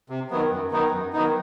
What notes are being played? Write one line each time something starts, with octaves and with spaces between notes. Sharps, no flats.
C3
D#3 F#3 B3
F#2
D#3 F#3 B3 D#4
F#2
D#3 F#3 B3 D#4